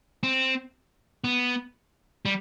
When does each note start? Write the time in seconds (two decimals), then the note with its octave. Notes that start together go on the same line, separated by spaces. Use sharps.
0.23 C4
1.24 B3
2.25 G3